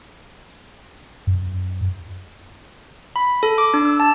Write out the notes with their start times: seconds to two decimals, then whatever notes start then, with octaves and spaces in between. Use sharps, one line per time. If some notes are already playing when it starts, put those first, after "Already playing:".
1.27 F#2
3.16 B5
3.43 A4
3.58 D6
3.74 D4
3.85 E6
4.00 A5